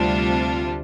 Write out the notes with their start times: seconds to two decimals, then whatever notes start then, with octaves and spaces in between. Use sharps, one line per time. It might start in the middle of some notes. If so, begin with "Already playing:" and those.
Already playing: D2 C3 G3 D4 F4